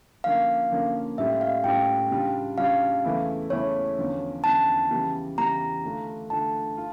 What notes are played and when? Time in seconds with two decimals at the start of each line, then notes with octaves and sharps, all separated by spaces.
0.24 D3 F3 A#3 C#4 F5
0.71 D3 F3 A#3 C#4
1.18 A2 G3 C#4 F4 E5
1.41 F5
1.64 A2 G3 C#4 F4 G5
2.11 C#3 G3 D4 F4
2.58 C#3 G3 D4 F4 F5
3.04 E2 C#3 E3 A3 E4
3.50 E2 C#3 E3 A3 E4 C#5
3.98 E2 D3 F3 C#4
4.44 E2 D3 F3 C#4 A5
4.90 E2 C#3 E3 G3
5.38 E2 C#3 E3 G3 A#5
5.84 D3 A3 D4 F4
6.30 D3 A3 D4 F4 A5
6.77 F4